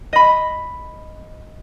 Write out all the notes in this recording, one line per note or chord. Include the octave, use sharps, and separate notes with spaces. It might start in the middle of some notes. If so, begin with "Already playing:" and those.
D#5 B5